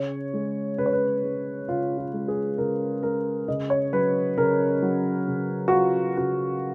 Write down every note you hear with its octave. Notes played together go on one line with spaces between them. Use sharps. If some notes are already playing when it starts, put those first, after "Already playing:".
Already playing: C#3 C#5
G#3
C#3 B4
C#5
B4
G#3
C#3 F4
F4
G#3
G#4
C#3 A#4
G#3 A#4
C#3 D#5
C#5
F#3 B4
C#3 A#4
F#3
C#3
F#4
F#3 F4
C#3 F#4